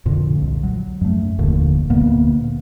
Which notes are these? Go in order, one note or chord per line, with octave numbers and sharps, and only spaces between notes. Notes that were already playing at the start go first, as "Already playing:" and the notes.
F2 A#2 D3
C2
F#3
F#2 A3
F1 D#2 A#2 D3
D2 A#2 A#3 B3